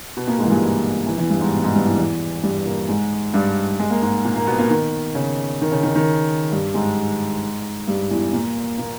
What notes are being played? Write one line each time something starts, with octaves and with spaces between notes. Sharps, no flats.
B2 B3
A#2 A#3
G#2 G#3
E3
G2 G3
E2 E3
E2 E3
G2 G3
G#2 G#3
B2 B3
G#2 G#3
G2 G3
E2 E3
E2 E3
G2 G3
A#2 A#3
G#2 G#3
G2 G3
G#3
A#3
G#2 G#3
A#2 A#3
A#2 A#3
B2 B3
A#2 A#3
D#3
C#3
D#3
C#3
D#3
D#3
G2 G3
G#2 G#3
G2 G3
E2 E3
A#2 A#3
A#2 A#3